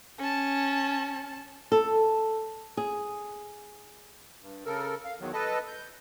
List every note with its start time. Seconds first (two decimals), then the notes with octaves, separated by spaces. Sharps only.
0.19 C#4 A5
1.72 A4
2.77 G#4
4.39 G2
4.66 C#3 A4 A#4
5.05 F5
5.20 E2 D#3 F#3
5.33 A4 B4 D#5 A5
5.68 G6